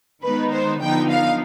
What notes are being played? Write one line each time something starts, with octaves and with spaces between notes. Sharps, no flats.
D#3 G#3 B3 D#4 B4
C5
D3 F3 B3 D#4 G5
F5